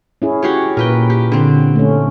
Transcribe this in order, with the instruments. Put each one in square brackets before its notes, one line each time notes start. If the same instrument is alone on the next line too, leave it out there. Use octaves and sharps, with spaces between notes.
[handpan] C#4 E4 G#4
[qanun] F#4 G4 C#5
[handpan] A#2 [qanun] A#4 B4 G5
[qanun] G4
D3 C4
[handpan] A3 C#4